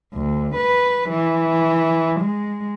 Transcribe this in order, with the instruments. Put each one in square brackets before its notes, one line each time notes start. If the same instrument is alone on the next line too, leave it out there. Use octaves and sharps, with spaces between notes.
[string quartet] D2
B4
E3
G#3